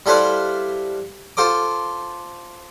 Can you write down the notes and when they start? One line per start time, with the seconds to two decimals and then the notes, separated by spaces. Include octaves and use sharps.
0.06 G3 E4 A4 B4 C5 F5
1.37 F4 A4 C5 D6